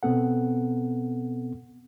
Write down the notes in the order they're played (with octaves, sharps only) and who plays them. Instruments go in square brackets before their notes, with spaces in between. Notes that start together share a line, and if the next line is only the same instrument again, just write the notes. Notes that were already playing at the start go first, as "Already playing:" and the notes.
[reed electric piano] B2 B3 C4 A4 F#5